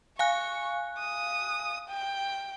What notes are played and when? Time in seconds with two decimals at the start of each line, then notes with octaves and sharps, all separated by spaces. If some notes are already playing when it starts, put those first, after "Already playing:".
0.19 F5 G#5 C#6 F#6
0.99 D#6
1.89 G5